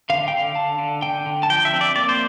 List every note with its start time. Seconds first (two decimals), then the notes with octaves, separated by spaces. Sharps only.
0.10 D3 F5
0.28 G5
0.33 D3 F5
0.55 D3 A5
0.79 D3
1.02 D3 G5
1.26 D3
1.43 A5
1.50 F3 G5
1.65 E5
1.73 C4
1.81 D5
1.96 A#3 D5
2.09 C5